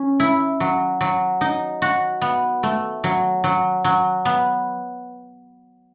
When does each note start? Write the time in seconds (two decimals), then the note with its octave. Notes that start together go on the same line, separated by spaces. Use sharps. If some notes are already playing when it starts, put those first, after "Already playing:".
Already playing: C#4
0.20 E4
0.60 F#3
1.01 F#3
1.41 D#4
1.82 F#4
2.22 B3
2.63 A3
3.04 F#3
3.44 F#3
3.85 F#3
4.25 B3